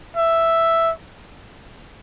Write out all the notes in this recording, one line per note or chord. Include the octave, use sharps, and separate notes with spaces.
E5